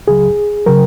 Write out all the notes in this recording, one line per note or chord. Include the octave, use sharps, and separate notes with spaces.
C#2 C#3 F#3 G#4
C#3 F#3 A#4